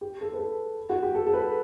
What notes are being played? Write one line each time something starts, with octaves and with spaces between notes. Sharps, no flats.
G4
A4
B4
A4
F#4
G4
A4
A4
B4